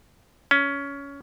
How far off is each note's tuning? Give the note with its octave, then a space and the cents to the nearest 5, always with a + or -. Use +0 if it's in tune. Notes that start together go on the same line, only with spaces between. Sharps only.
C#4 +15